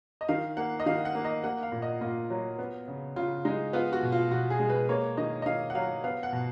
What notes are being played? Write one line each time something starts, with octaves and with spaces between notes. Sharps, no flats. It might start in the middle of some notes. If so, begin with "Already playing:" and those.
D#5
D#3 F5
A#3 F#5
D#5
D#3 F5
F#5
A#3
D#5
A#3 F#5
F5
A#2
D#5
A#2 F4
F#3
B3
C#3
C#3 F4
G#3 D#4
B3 F4
F#4
B2
F4
B2 F#4
G#4
G#3
B4
A#3 C#5
D#3 D#5
D#5
D#3 F5
F#5
F#3 F5
B3 F5
F#5
B2